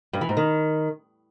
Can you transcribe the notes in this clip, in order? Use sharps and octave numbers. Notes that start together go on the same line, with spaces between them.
G2
E3
G#2
D#3